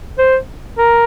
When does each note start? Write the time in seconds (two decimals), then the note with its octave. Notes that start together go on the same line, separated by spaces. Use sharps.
0.18 C5
0.78 A#4